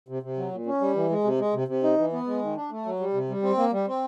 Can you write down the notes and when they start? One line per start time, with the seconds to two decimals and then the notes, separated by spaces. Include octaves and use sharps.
0.09 C3
0.23 C3
0.37 F#3
0.51 A#2
0.66 C#4
0.81 G3
0.96 E3
1.10 G#3
1.24 C3
1.39 G#3
1.54 C3
1.68 C3
1.83 D#4
1.98 E3
2.13 B3
2.27 G#3
2.42 D#3
2.56 D4
2.71 A3
2.85 F#3
3.00 G3
3.14 C3
3.29 G3
3.43 C4
3.58 A#3
3.72 G3
3.87 C4